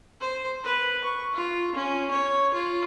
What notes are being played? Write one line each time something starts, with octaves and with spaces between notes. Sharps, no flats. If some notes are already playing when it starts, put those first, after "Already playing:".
C5
B4
C#6
F4
C#4
C#5
F4